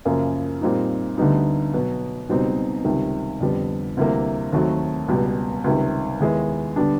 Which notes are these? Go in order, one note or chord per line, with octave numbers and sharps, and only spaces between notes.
F#2 C#3 F3 A#3
A#2 G3 C4 D#4
D2 D3 G3 B3 D#4
B2 F#3 B3
C#2 B2 G3 C4 D#4
C#2 C3 D#3 G3
F2 D3 G3 B3
D2 C3 E3 G3 A#3
D#2 D#3 F#3 A3 C4
C#2 B2 G3
C#2 C3 D#3 G3
D#2 D#3 G#3 B3 E4
D3 G3 B3 D4